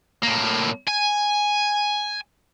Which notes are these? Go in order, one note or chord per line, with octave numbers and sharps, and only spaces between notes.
A2 A#3
G#5